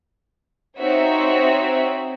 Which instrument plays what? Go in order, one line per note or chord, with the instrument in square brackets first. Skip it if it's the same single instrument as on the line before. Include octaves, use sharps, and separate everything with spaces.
[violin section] C4 D#4 F#4 C5 C#5 E5